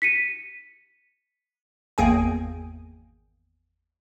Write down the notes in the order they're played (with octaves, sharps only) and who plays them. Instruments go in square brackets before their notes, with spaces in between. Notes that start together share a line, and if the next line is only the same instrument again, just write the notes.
[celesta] B6 C#7 D#7
[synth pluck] G#1 E2 A#3 G#4 G5 G#5